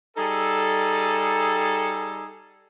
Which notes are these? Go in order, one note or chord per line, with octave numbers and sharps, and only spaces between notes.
G3 D#4 G#4 A4